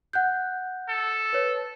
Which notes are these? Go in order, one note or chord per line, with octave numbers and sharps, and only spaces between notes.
F#5 F#6 G6
A4
B4 C#5